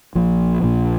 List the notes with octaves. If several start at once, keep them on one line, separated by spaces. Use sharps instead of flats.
A#1 A#2 F3
A#1 A#2